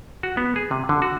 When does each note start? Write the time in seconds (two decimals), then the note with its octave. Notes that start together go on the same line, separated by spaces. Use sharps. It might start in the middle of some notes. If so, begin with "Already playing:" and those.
0.23 F#4
0.37 B3
0.56 G#4
0.71 C3
0.89 D3
1.02 F#4